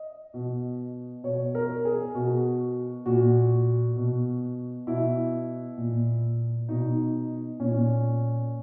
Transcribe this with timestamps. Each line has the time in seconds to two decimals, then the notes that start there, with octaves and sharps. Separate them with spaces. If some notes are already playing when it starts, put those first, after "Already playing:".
Already playing: D#5
0.34 B2
1.24 B2 C#5
1.55 A#4
1.85 G#4
2.15 B2 F#4
3.06 A#2 F#4
3.96 B2
4.87 B2 E4
5.78 A#2
6.69 B2 D#4
7.60 A#2 C#4